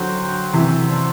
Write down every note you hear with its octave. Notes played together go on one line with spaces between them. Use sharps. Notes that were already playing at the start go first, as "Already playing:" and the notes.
Already playing: D3 F#3 F#4 C5 G5
C3 E3
A3 D4 A4 C5